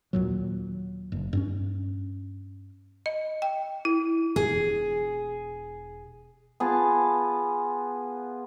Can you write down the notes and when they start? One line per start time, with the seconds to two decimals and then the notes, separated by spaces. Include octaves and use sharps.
0.13 D#2 A#2 F#3
1.12 F#1
1.33 G2 C4 C#4
3.06 D#5
3.42 G5
3.85 E4
4.36 E1 G#4
6.60 B3 F4 G#4 A5